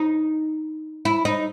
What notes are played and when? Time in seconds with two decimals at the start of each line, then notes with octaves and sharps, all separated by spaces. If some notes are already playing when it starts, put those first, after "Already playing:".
Already playing: D#4
1.05 E4
1.25 D#4